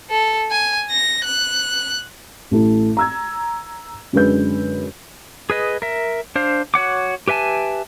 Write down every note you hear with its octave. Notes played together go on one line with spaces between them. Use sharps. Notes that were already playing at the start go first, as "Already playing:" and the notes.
A4
G#5
A#6
F#6
A1 A3 E4
A#5 E6 G#6
F#2 D3 G#3 B4 G6
G#4 B4 D#5
A#4 E5
D4 C5 F5
F#4 C#5 F#5 D6
G4 B4 E5 G#5 A5